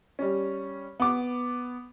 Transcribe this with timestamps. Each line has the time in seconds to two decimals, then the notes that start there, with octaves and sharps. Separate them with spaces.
0.19 G3 C#4
1.00 B3 D6